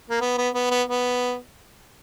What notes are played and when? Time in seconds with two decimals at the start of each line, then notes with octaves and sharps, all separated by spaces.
0.10 A#3
0.21 B3
0.38 B3
0.54 B3
0.71 B3
0.88 B3